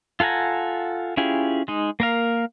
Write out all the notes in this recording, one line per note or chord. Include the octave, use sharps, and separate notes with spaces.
F4 A4 F#5 G#5 A#5
C#4 E4 F4 G4 G#4
G#3 D#4
A#3 A#4 F5